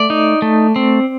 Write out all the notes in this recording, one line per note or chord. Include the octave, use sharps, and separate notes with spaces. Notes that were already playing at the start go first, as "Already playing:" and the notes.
Already playing: A3 D5
D#4
A3
C4